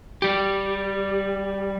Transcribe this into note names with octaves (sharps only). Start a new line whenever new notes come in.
G3 G4